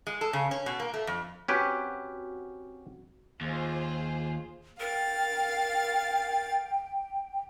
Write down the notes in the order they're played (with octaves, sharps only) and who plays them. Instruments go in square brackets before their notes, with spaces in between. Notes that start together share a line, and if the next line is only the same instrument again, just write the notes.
[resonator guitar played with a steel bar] G#3
A4
C#3
C#4
B2
A#3
A3
F2
[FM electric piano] C4 F#4 [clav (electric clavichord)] C#4 G4 B4
[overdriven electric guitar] D#2 [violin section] F4 G#4 C5
[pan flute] A#4 [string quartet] F5 A6 [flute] G5